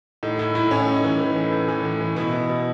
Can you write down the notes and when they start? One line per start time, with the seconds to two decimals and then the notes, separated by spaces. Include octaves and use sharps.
0.23 A2 D#4
0.39 A2 E4
0.55 A2 E4
0.71 A2 C#4
0.88 A2
0.96 D#4
1.04 E3
1.20 E3
1.36 A2
1.52 A2
1.68 E3
1.85 A2
2.01 E3
2.16 B2 E4
2.33 B2
2.49 B2